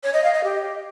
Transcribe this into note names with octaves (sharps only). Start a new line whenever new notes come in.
C#5
D#5
F5
D#5
G4